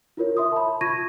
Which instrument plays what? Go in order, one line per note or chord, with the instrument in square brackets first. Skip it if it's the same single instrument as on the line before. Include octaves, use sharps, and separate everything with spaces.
[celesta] E4 F4 A#4 C#5
E5 C6 D#6
A5 B5
F4 C#6 G#6 A#6 D#7